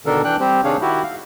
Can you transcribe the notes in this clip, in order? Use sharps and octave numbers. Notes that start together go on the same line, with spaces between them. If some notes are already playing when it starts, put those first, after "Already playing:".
B2 D3 D#3 D4 A4 A#4
E3 D4 G5 F#6
G3 C4 G4 C5
C3 D#3 D4 G#4 C#5 F5
D#3 E4 F#4 G4
F5